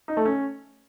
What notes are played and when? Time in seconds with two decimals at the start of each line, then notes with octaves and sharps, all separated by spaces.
0.08 D#4
0.17 A3
0.25 C#4